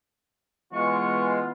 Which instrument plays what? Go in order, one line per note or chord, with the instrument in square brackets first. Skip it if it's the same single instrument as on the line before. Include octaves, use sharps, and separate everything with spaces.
[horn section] E3 B3 F4 [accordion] G#3 [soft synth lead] C#6